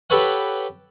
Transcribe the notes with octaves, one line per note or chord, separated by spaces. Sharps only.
G4 A4 B4 C#5 F#5